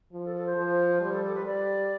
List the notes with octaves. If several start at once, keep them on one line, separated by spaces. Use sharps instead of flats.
F3 F4
A4
A4
C5
F3
G3 C5
A4
A4
B4
G3 D5